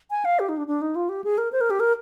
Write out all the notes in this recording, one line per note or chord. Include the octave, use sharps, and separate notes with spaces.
G#5
F5
G4
D#4
D4
D4
D#4
F4
G4
G#4
A#4
C5
A#4
G4
A#4